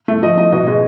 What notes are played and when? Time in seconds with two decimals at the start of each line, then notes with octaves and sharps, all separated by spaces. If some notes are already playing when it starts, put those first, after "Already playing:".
0.08 A3
0.23 F3 D#5
0.37 A3 D#5
0.52 B2 D#5
0.67 G#3 D#5